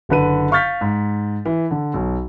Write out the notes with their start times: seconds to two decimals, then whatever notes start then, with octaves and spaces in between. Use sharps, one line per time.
0.09 F#1 D3 B4 D#7
0.51 F5 C#6 F6 G6 A6 B6
0.81 G#2
1.45 E3
1.71 D3
1.94 B1